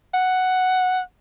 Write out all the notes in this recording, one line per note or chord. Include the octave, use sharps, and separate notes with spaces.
F#5